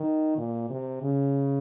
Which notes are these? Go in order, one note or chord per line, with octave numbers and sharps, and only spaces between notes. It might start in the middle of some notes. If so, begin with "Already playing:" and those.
Already playing: D#3
A#2
C3
C#3